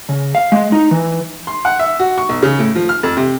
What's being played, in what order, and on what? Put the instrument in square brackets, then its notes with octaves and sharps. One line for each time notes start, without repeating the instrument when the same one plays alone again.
[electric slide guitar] C#3
F5
G#3
D#4
E3
[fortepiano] C6
F#5
E5
F#4
C#6
B1
C#3
A2
F3
F6
F2
C3